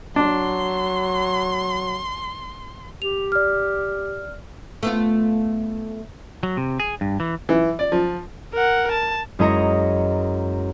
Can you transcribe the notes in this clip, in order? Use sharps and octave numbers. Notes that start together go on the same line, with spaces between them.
F#3 D4 C6
G4 F7
D5 F6
A3 B3 F4
F#3
C3
G#4
G2
E3
E3
D5
F3
A#4 F#5
A5
F#2 G#3 E4 D#5 A#5 C#7